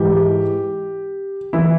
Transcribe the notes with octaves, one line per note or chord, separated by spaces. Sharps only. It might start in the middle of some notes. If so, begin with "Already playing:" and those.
Already playing: G#2 E3 G4
E3 E4